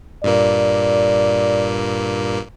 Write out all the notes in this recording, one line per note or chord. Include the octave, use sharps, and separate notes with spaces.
G2 A#2 A#3 D5